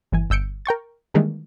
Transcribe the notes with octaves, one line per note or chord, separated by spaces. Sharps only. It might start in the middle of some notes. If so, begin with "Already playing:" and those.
G1 E3 G#5
G1 E6 G6 C#7 D7
A#4 G5 C#6 A6
D#3 E3 G3 G#3 A#3 D4